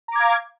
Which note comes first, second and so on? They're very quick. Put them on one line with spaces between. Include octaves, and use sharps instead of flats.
A#5 D6 G#6 F5